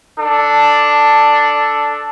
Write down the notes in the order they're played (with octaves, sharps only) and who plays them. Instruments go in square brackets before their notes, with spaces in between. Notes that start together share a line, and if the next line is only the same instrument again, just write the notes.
[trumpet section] D4 A4